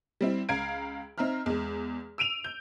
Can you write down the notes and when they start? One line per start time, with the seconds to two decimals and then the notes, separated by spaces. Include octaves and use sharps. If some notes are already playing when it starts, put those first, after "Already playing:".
0.21 G3 C4 E4
0.49 C#2 F5 A#5 G#6 D7
1.18 C4 D#4 E5 A#5 F6
1.46 E2 G#3
2.18 E6 D7 D#7 F7
2.44 G6